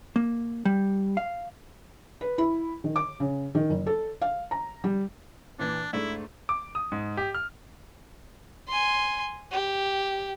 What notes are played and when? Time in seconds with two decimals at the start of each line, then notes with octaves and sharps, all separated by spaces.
0.16 A#3
0.65 G3
1.17 F5
2.21 B4
2.38 E4
2.84 D#3
2.96 D6
3.20 C#3
3.55 D#3
3.70 F#1
3.87 A4
4.22 F5
4.51 A#5
4.84 G3
5.59 A#2 E3 D4
5.93 G#2 A3 D4 E4
6.49 D6
6.75 D#6
6.92 G#2
7.17 G4
7.35 F6
8.68 G#5 C6
9.51 G4